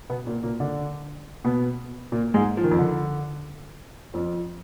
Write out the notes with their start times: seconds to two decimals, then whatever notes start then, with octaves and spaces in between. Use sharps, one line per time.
0.10 B2 B3
0.27 A#2 A#3
0.43 A#2 A#3
0.60 D3 D4
1.44 B2 B3
2.12 A#2 A#3
2.34 G#2 G#3
2.57 F3
2.64 D#3
2.71 F2 F3
2.79 D3
4.14 F2 F3